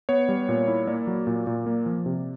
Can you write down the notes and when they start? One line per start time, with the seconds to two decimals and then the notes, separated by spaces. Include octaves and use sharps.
0.09 B3 C#5
0.29 G3
0.49 A#2
0.68 E4
0.87 A#3 D5
1.07 F#3
1.27 A#2
1.47 A#2
1.66 A#3
1.86 F3
2.06 C3